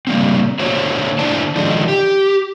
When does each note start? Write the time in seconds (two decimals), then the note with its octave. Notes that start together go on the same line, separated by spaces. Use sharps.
0.07 C#3 G3 A#3 C4
0.60 D3 A3 D4 F#4 C5 C#5
1.19 D3 D4 E4 C5 D5 A5
1.56 D3 D#3 F3 G#3 D4 D#4
1.88 G4